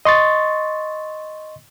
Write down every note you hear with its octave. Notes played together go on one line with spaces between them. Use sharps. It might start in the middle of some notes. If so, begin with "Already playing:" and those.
D#5 C6 C#6 A6